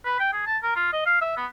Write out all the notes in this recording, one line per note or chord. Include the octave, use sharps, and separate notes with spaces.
B4
G5
G#4
A5
A#4
F4
D#5
F5
E5
B3